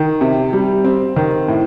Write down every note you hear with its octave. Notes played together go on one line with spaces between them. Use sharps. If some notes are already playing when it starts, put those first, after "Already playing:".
Already playing: D#3
C3
G3
C4
D#3
A2